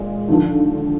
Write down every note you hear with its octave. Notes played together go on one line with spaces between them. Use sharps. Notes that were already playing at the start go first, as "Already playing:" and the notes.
Already playing: A#2 G#3
D#2 D3 F3